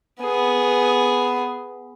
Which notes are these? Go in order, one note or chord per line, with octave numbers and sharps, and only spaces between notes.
B3 G#4